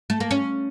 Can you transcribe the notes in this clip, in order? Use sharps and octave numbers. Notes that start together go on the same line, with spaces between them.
A3
A#3
C#4